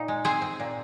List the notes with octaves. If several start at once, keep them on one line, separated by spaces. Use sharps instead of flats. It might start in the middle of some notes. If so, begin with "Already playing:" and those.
Already playing: A#2 D#4
G#3
C4 G#4 C5
C4
A#2